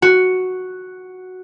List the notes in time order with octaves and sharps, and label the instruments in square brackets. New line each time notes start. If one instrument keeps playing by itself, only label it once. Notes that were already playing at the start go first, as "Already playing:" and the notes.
[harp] F#4